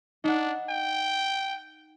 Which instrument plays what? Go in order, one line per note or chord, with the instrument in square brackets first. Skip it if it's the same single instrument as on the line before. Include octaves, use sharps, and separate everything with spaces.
[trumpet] D4 [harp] D#4 F#5
[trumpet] G5